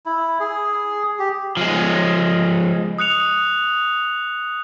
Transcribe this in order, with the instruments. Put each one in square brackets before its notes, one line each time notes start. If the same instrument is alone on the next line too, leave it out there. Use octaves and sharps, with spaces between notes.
[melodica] E4
G#4
G4
[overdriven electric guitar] F3 G#3
[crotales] D#6 F#6 C#7 F7